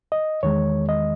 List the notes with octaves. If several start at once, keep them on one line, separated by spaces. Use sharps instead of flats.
D#5
E2 D#3 G#3 C#5
D#5